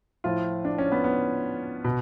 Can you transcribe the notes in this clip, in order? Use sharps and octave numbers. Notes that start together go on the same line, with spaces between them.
A2 F3 F4
D4
C#4
B3
B3
B2